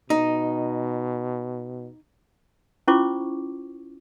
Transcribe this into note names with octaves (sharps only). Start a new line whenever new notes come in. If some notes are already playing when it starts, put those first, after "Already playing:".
B2 D#4
C#4 E4 F4 C5 C#6 D6